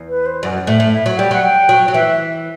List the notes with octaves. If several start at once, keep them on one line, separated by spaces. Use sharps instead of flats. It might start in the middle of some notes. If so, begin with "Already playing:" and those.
Already playing: E2
B4
C5
F#2 D5
D5
A2 E5
A2
E5
F#3
G3 G5
F#3 F#5
G5
F#3
F#3
E3 E5